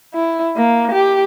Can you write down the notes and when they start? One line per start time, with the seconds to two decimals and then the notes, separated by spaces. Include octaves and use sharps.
0.14 E4
0.57 A#3
0.92 G4